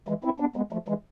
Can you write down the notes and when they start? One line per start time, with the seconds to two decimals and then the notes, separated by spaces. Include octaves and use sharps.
0.08 E3 G#3
0.24 C4 E4
0.40 B3 D4
0.56 G#3 B3
0.72 F3 A3
0.88 E3 G#3